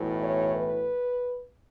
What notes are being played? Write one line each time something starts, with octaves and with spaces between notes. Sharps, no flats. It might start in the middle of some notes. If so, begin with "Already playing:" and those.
Already playing: B1 A2 E3
C#5
B4